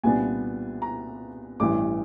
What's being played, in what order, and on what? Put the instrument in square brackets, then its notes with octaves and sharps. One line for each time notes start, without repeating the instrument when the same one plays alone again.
[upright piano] C2 A#2 G3 B3 D4 G#5
A#5
A1 G2 E3 D6